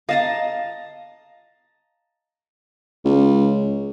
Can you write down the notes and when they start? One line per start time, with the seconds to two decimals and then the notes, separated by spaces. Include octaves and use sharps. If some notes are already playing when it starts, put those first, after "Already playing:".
0.09 D#5 F5 A5 A#5
3.05 C#2